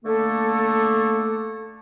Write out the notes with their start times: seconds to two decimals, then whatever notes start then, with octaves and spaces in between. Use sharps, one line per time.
0.04 D3 A3 A#3 A4